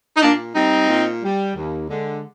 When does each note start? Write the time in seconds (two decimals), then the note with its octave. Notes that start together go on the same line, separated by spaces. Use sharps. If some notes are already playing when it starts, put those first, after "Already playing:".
0.16 D#4
0.22 A#2 A#3 D4
0.55 G3 C4 D#4
0.89 A#2
1.23 G3
1.55 D#2
1.89 D3 G#3